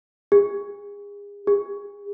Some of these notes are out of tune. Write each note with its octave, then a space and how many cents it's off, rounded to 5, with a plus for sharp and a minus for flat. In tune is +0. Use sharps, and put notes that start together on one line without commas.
G#4 -35
G#4 -35